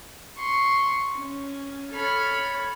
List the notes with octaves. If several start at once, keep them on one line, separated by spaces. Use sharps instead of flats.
C6 C#6
C#4
A4 C#5 B5 F6